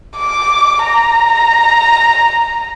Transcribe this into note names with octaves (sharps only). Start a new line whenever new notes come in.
D6
A#5